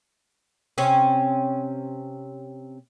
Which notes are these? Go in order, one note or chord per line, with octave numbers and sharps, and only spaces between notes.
C3 C4 C#4